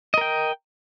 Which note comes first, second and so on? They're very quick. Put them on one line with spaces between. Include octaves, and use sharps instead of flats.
D#5 A#4 G5